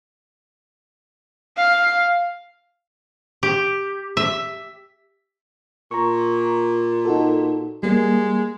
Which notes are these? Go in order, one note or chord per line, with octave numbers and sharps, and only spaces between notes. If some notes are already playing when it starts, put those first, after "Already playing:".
F5
G4
E5
A#2 A#5 C#6
D#4 F#4 A4
G3 G#3 A#3